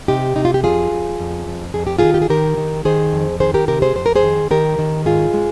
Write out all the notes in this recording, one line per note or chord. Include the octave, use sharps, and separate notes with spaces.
C3 D#4 G4
C3 D#4
F4
G4
F2 F4 G#4
F2
F2
F2
F2 G#4
G4
D#3 F4 G#4
G4
G#4
D#3 G4 A#4
D#3
D#3 G#4 C5
F2
D#3 G#4 C5
G4 A#4
C3 G4 A#4
G#4 C5
F2 C5
A#4
G#4 C5
D#3
D#3 G4 A#4
D#3
G#2 F4 G#4
G#3